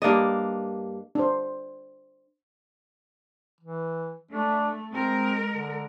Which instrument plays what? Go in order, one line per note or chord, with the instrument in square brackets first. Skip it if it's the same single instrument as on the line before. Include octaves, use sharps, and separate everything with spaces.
[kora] G2 A#3 D4 D#5
[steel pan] D4 C5
[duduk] E3
[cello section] A3 [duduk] D4
[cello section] G#3 A#4 [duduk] C4
[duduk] D3